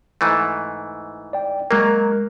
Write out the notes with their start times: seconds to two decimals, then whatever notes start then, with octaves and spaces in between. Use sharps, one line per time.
0.21 G#2 E3 A3
1.33 D5 G5
1.71 F#3 G#3 A#3 A#4